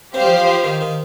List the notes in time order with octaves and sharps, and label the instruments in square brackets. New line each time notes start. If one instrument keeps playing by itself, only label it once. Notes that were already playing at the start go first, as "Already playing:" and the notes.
[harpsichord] C4 [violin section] G4 C5 F5
[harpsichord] G3
F3
F3
F3
D#3
D#3